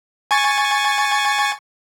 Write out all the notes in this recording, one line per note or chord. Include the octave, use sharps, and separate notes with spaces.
G#5 C#6 A6